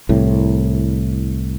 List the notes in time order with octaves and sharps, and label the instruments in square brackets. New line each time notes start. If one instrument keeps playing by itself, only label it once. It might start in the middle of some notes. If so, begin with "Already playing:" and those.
[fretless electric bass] C2 A2